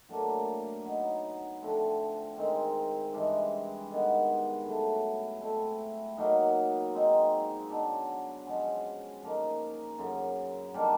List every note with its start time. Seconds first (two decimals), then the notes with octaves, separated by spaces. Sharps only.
0.09 A2 F#3 A#3 D4
0.84 F#3 B3 D#4
1.61 D3 F3 A3 C4
2.37 D#3 G#3 C4
3.13 G2 E3 G#3
3.89 C3 D#3 G#3 B3
4.65 A2 F#3 A3
5.41 A3 C4 E4
6.17 B2 F#3 A#3 D#4
6.93 G#3 C4 D#4
7.69 B2 F#3 B3 D4
8.46 F3 G#3 C#4 F#4
9.22 F3 A#3 D#4
9.98 F#2 C#3 F#3
10.74 D#3 G3 A#3 D4